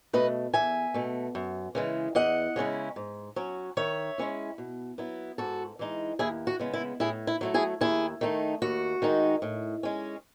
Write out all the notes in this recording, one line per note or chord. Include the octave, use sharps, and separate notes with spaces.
B2 A3 B4 D#5
E2 E5 G#5
B2 A3
F#2
C#3 E3 G#3
E2 D#5 F#5
C#3 G#3 C#4 E4
G#2
F#3 C#4
D#3 C#5 E5
G#3 C#4 E4
B2
F#3 B3 E4
G#2 F#4 A4
E3 G#3 D#4
D#2 E4 G#4
F#4
C#3 G#3 B3
E4
A2 E4 G#4
E4
F#3 A3 E4
E4 G#4
D#2 E4 G#4
D#3 A3 D#4
D#2 F#4
D#3 G#3 D#4
A2
G#3 C#4